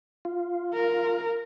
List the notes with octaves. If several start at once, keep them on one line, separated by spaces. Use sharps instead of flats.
F4
A#4